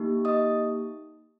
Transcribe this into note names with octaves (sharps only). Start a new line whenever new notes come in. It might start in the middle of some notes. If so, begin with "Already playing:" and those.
Already playing: A#3 D#4 G4
D#5 D#6